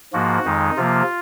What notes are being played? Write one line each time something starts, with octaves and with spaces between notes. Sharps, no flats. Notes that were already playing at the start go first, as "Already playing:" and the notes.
G#2 F3 A#3 F#4
F2 D#3 G#3 D#4
C3 F3 A#3 F4